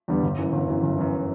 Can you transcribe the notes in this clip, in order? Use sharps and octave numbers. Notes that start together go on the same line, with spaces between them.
E2 D3 G3 B3
G1
F#2 E3
G1
F#2 E3
G1
F#2 E3